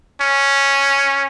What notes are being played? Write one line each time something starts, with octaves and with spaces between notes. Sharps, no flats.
C#4